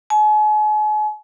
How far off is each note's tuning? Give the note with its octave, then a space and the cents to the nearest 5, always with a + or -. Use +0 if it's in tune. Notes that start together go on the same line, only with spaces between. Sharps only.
G#5 +40